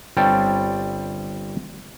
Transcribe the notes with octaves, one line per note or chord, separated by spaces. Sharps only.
G1 G3 C4 C#5 G5 A5